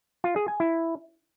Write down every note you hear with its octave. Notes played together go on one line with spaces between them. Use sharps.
F4
G#4
G#5
E4